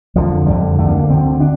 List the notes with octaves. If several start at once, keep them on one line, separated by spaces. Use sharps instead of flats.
F2 D3 F3
F2 D3 G3
D2 D3 A3
A#3
A#3
D2 D3 C4
D4